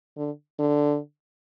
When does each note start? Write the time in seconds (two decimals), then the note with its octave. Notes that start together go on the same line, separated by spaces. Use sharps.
0.17 D3
0.59 D3